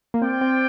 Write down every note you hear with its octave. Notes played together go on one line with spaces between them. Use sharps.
A#3
C4 F4 D5 G5
C4